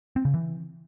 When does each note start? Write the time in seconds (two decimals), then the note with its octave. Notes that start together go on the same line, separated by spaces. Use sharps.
0.16 C4
0.25 C#3
0.34 E3